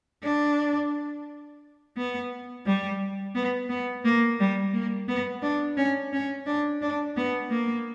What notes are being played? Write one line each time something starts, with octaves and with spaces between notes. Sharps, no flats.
D4
B3
G3
B3
B3
A#3
G3
A#3
B3
D4
C#4
C#4
D4
D4
B3
A#3